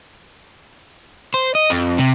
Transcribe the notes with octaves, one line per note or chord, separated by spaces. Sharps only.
C5
D#5
F2
C3